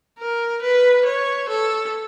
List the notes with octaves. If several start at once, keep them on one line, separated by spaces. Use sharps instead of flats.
A#4
B4
C#5
A4